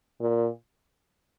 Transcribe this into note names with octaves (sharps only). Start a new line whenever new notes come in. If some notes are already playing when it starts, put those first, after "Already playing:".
A#2